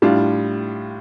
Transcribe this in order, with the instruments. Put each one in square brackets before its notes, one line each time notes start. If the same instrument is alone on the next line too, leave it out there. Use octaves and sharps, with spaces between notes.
[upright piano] A2 G3 D4 F4